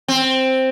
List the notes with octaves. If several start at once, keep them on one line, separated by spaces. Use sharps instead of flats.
C4